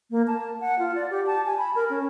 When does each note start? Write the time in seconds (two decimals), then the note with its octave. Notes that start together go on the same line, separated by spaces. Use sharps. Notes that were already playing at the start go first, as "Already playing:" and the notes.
0.11 A#3
0.27 A5
0.61 F#5
0.79 F4
0.95 D5
1.11 G4
1.26 A5
1.46 G#5
1.58 B5
1.76 A#4
1.90 C#4